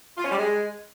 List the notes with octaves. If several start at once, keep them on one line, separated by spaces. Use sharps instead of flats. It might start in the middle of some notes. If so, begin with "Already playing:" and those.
F4
C#4
G3
G#3